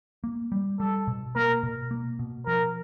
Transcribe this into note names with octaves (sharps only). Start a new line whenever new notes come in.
A#3
G3
G3 A4
B2
A#3 A#4
B2
A#3
B2
F3 A#4